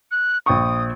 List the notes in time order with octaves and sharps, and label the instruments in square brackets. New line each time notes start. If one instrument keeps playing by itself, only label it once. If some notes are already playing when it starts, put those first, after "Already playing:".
[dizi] F#6
[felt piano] A#1 G5 C#6 [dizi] D#6